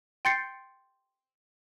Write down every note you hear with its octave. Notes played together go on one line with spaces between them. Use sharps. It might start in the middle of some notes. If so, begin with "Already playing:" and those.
G5 C6 G6 A6 C7 C#7